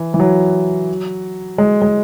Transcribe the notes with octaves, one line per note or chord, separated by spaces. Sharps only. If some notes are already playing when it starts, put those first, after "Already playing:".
Already playing: E3
E3
F#3
G#3
G#3